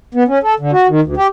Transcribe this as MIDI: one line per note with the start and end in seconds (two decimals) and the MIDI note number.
0.15 0.23 59
0.28 0.38 61
0.43 0.55 69
0.59 0.71 50
0.72 0.87 66
0.89 1.00 51
1.03 1.15 38
1.17 1.27 67